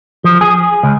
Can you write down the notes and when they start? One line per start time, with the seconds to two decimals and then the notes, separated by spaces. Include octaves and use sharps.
0.24 F3
0.41 G#4
0.83 C#2